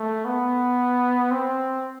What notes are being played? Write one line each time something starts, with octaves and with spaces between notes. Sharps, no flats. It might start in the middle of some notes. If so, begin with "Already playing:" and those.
Already playing: A3
B3
C4